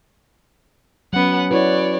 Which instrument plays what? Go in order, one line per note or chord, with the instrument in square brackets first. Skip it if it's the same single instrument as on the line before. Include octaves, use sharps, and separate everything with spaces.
[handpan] F#3 C#4 [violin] B3 F#5
[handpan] E4 F#4 B4 [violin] C#5 D5